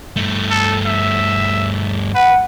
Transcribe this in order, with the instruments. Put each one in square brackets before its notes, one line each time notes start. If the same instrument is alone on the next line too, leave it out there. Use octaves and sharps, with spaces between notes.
[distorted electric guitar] G2 A3
[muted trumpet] A4
E5
[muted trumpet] B4 [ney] F#5